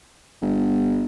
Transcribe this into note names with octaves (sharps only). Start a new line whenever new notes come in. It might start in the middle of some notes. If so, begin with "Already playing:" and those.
G1